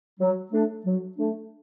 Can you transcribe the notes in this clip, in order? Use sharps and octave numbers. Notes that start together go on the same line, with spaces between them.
F#3
A3 D4
F#3
A3 D4